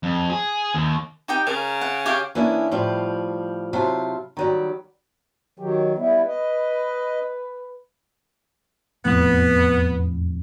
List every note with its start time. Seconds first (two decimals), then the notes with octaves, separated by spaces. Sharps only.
0.03 F2
0.30 G#4
0.74 D#2
1.28 D#4 G4 G5
1.47 C#3 A#4
1.81 F#5
2.06 G4 C#5 F5
2.35 E3 A#3 B3 C#4 D4 E4
2.72 A2 F3 G3 F4
3.73 C3 F#3 E4 F4 C5 A5
4.37 D#3 F#3 G3
5.60 D#3 F#3 G4
5.98 G3 B3 E4 B4
6.27 D#5
9.05 E1 F2 A2 B3